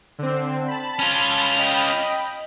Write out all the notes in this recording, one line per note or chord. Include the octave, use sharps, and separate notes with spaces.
D3 C4
A5 B5
C#4 F4
D#5 G5 B5